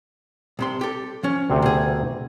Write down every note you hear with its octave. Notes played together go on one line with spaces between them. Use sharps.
C2 C3 C6
G4 A4
F3 C#4
D2 C3 C4
B2 G#4